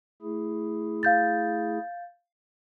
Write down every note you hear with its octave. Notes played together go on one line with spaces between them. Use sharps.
A3 E4 G#4
F5 G6 A6